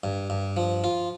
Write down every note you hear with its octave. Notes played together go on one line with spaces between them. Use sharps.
G2
G2
F3
F4